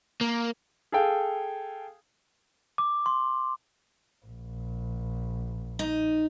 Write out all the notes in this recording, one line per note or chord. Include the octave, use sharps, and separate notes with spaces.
A#3
G#4 A4 F5 G5 G#5
D6
C6
A#1
D#4